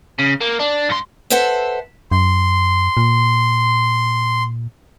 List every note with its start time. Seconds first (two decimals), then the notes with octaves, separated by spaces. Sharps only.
0.19 C#3
0.41 A#3
0.60 D4
0.90 G2 C6
1.30 A4 B4 C5 E5 F#5 A5
2.11 F#2 C6
2.97 A#2